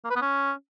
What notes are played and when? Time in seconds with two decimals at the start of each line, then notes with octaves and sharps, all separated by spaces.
0.05 A#3
0.10 B4
0.16 B3
0.21 C#4